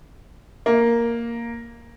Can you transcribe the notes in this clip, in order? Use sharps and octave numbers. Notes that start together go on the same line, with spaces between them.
A#3